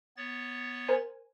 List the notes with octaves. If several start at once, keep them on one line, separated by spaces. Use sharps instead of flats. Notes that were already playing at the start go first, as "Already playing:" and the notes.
B3 C#5 A6
A#4 C5 G#5